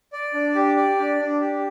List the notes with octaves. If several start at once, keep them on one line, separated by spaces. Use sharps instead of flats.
D5
D4
G4
D5
D4
D4
G4